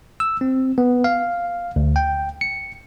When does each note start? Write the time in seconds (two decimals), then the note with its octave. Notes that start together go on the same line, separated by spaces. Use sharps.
0.20 E6
0.41 C4
0.78 B3
1.04 F5
1.76 D2
1.96 G5
2.41 C#7